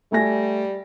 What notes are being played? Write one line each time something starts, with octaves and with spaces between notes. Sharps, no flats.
G3 A3 G#5 A#6